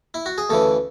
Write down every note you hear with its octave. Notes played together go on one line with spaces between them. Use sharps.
E4
F#4
G#4
D2 C#3 E3 A4